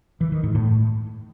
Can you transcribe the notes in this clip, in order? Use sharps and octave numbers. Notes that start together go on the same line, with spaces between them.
E3
D#3
G#2
A2